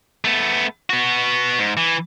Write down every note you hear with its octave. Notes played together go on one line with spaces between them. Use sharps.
A3 B3
B3 F#4
G#2
E3